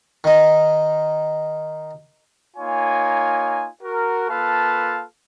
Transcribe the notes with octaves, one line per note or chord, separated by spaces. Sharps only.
D#3 D#4
A#3 D#4 F4 C#5 G#5
F#4 A#4
A#3 F4 A4 B4 F5 A5